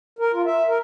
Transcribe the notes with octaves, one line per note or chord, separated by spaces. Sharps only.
A#4
F4
E5
A#4